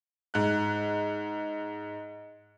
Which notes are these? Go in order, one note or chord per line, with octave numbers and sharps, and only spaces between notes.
G#2 F#6